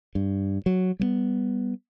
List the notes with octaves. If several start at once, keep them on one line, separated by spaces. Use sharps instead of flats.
G2
F#3
G3 G#3 B3